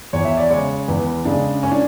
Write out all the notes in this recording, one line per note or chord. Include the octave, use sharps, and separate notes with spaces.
E2 C#5
E5
D5
C#3 G#3 C#5
E2 B4
C#3 G#3 D4
C#4
D4